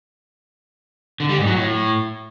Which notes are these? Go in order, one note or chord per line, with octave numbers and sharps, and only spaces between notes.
D3
G3
G#2
F#3
A2